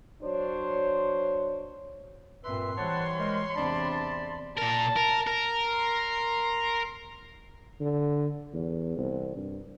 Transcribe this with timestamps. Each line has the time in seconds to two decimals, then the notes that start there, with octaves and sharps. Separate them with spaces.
0.22 F#3 D4 C5 C#5
2.44 G2 A#2 C4 B4 E5 C6
2.78 E3 G3 C5 C#5 F#5 A5
3.18 G#3 A#4 C5
3.56 E2 C3 D4 D5 A5 B5
4.57 A#2 A#4 A5
4.96 A#4
5.27 A#4
5.69 C6
7.80 D3
8.53 E2
8.97 C2
9.37 G2